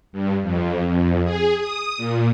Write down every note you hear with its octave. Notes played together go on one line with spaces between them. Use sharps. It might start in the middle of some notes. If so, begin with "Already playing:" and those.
G2
F2
F2
G#4
D#6
A#2